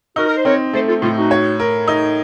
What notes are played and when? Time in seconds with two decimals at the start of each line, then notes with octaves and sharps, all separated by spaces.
0.16 D#4 F#4 A#4
0.27 A#4
0.36 C5
0.45 C4 A#4 C#5
0.73 A3 A4 C5
0.88 F4 A4
1.02 A2 F4 A4
1.16 D#4 F#4
1.31 C#5
1.60 A#4
1.87 D#4